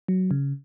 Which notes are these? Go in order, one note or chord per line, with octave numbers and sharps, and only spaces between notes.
F#3
C#3